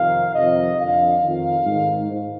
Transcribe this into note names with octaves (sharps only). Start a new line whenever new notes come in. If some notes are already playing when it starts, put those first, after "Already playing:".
Already playing: F2 C3 D#3 F5
F2 C3 D#3 D#5
F2 D3 F5
F2 D#3
G#2 D#3
G#2